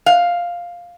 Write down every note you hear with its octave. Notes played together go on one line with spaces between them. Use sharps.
F5